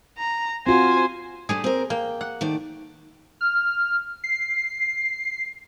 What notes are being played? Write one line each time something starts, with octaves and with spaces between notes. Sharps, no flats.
A#5
C4 F4 F#4 C5 G#5
G3 A3 D4 G#4
C4 A#4
A#3 G5
F#5
D#3 A3 D5
F6
C7